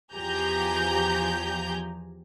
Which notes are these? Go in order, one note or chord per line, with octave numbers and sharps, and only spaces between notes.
E2 F3 G4 G#5 A#5 G6